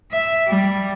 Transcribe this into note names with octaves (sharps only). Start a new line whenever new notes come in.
E5
G3